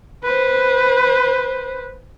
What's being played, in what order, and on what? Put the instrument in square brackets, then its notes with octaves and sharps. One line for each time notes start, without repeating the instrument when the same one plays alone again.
[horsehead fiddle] B4 C5